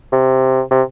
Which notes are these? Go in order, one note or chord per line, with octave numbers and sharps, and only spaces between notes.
C3
C3